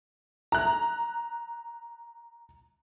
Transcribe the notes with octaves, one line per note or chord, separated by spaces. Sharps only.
A#5 F#6